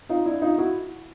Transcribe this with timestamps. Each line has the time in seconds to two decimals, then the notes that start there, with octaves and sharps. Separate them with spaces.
0.09 D#4 F4
0.26 D4 E4
0.42 D#4 F4
0.58 E4 F#4